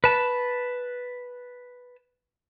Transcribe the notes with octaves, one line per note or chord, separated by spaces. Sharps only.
B4 A5